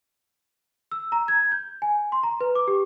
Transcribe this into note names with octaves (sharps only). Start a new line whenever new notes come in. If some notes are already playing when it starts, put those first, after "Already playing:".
E6
A#5
G#6
G6
G#5
C6
A#5
B4
D6
G4